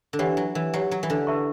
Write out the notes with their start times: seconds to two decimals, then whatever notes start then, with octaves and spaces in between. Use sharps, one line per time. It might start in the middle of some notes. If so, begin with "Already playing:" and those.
0.13 D3
0.19 E3 G4 C#5 F#5
0.37 F#3
0.55 E3
0.74 F#3 G4 C#5 F#5
0.91 F#3
1.03 E3
1.10 D3
1.27 E4 B4 E5 A5 C#6